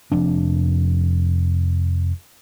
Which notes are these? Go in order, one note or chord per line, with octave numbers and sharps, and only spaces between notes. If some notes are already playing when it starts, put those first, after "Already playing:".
F1 F2 D4